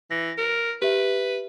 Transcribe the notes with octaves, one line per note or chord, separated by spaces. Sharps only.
E3 A#6
A#4
G4 B4 E5